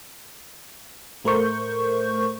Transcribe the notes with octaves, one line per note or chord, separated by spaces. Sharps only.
A2 A3 A#4 C5 C#6 G6